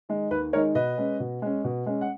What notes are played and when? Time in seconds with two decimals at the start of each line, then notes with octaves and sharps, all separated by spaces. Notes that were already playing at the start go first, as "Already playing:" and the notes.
0.09 D#3 G#3 D#4
0.31 D#2 B4
0.53 D#3 G#3 D#4 A#4 C#5
0.75 B2 B4 D#5
0.98 G#3 C#4
1.20 B2
1.42 G#3 C#4
1.64 B2
1.86 G#3 C#4
2.01 F#5